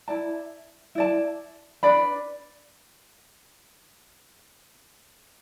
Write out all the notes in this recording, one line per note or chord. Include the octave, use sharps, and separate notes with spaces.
E4 D5 A5
E4 D5 A5
D4 B4 D5 B5